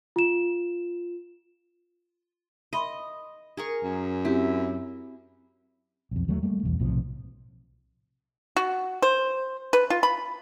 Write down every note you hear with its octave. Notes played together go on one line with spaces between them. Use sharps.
F4 E7
D#5 E5 B5 C6
G#4 A#4 C#6
F#2
C4 E4 G4
B1 F2
D#2 F#3 G3 A3
G3 A3 A#3
B1 E2 B2
B1 A2 C3 F3
F#4
C5
B4
F4
B5